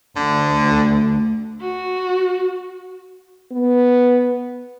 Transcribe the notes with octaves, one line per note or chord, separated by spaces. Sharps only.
D2 D3
F#4
B3